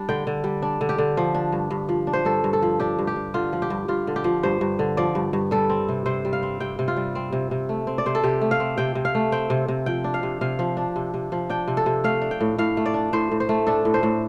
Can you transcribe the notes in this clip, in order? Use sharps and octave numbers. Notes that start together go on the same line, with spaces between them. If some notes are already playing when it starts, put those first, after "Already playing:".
Already playing: G3 D4
D3 G5
D3
G3
D4
D3
G4
D3
F3
D4
G2
G2
F3
D4
C5
G2 A4
G2
A4
F3
D4 G4
G2
G4
G2
D3 F4
F3
G4
G2
G2 F4
D3
G4
F3
G2 C5
G2
D3
F3 D5
G2
G2
G3 A4
C4
C3
C3 C5
G3
F5
C4
C3 G5
C3
F4
G3
C4
C3
C3
A3
C4
D5
C3 C5
A4
C3 G4
A3
F5
C4
C3 G5
C3
F5
A3
C4 G5
C3
C3
F3 G5
D4
F5
C3
C3 F5
F3
D4
C3
C3
F3
D4 G5
C3
A4
C3
A3 F5
D4
G5
A2
A2 F5
A3
D5
D4
A2 C5
A2
C5
A3
D4 A4
A2
C5
A2